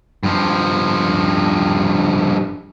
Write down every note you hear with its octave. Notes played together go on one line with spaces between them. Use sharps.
G2 F3